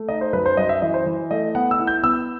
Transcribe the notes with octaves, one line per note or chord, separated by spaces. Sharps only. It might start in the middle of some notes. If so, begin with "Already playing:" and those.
Already playing: A3
D#4 D#5
C5
F#2 B4
C5
F#2 D#5
E5
E3 D#5
C5
E3
A3 D#5
B3 F#5
E6
E4
G6
B3 E6